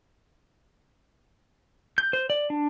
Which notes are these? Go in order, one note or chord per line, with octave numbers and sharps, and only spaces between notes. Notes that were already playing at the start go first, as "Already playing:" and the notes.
G6
C5
D5
D4